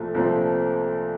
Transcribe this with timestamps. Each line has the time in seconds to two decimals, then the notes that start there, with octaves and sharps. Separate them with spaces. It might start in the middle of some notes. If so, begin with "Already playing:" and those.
Already playing: C2 A#2 F3 A3
0.14 C2 A#2 F3 A3 C4